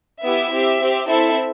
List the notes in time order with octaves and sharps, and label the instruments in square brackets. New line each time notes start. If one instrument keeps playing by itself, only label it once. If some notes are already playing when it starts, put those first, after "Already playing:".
[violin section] B3 E4 G4 E5
C4 G4
C4 G4
C4 E4 A4 E5